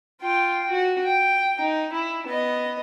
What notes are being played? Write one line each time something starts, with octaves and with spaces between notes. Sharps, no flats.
F4 G5
F#4
G5
D#4
E4
B3 D#5